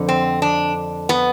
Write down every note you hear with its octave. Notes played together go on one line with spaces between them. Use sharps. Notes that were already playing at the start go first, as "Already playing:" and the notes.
Already playing: F2 D3
C4
D4
B3